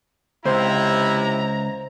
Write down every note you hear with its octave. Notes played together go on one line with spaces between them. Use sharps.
C#2 C3 E4 C5 A#5